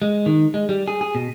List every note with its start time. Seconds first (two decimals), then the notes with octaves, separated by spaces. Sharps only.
0.02 G#3
0.26 D#3
0.54 G#3
0.69 G3
0.88 G#4
1.01 G#4
1.15 B2